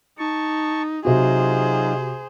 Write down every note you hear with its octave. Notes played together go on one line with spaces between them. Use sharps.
D#4 A5 C#6
C3 F#3 D#4 F4 F#4 G#4 C5